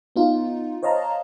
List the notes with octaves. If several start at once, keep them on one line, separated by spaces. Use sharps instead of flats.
B3 D#4 F4
C5 C#5 D#5 F5 A5 A#5